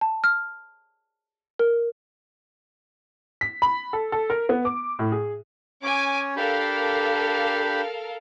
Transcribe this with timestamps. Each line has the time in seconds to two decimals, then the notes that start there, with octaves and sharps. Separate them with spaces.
0.01 A5
0.24 F6
1.59 A#4
3.41 B6
3.62 B5
3.93 A4
4.12 A4
4.30 A#4
4.49 B3
4.65 D6
4.99 A2
5.12 G#4
5.83 C#4 C#5 G#5 D6
6.36 D4 G4 A4 A#4 F5 B5